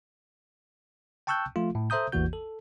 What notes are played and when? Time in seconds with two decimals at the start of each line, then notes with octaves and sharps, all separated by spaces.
1.27 G5 A5 C#6 E6 F#6 G6
1.56 F3 A3 F4
1.75 A2
1.90 A4 C5 E5 A#5 D#6 G6
2.12 A1 E2 E3 A#3 F#4 G6
2.33 A4